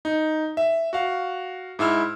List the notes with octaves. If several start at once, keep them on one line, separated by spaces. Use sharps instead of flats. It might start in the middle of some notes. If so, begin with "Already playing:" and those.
D#4
E5
F#4 F5
G#2 E4 E6 F6